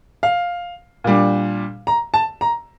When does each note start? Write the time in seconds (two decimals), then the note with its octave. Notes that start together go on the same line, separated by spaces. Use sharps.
0.23 F5
1.04 A#2 G3 D4
1.87 A#5
2.14 A5
2.41 A#5